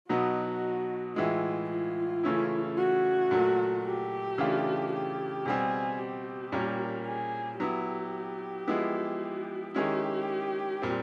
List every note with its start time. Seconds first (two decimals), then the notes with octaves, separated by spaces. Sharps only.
0.09 B2 F#3 B3 D#4 F#4
1.16 A2 E3 G#3 F4
1.70 F4
2.23 C#3 E3 A3 C#4 E4
2.77 F#4
3.31 A#2 F#3 A3
3.85 G4
4.38 C#3 E3 A3 D4 F4
4.92 G4
5.46 B2 G3 C4 G#4
5.99 G4
6.52 A#2 G3 A#3 C#4
7.06 G#4
7.60 F#3 B3 E4 G4
8.68 F3 G#3 B3 E4
9.74 D#3 G#3 C#4 E4 G4
10.82 A#2 G3 C4